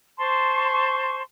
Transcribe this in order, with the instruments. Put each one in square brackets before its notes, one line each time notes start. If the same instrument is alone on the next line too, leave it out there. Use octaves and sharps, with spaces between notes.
[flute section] C5 A5 C6 C#6